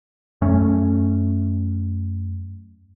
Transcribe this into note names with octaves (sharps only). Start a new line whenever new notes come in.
F#2 A3 C#4